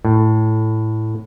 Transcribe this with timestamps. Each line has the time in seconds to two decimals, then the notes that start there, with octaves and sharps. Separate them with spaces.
0.05 A2